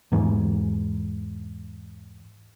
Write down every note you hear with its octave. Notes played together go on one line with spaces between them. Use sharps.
E2 G#2 E3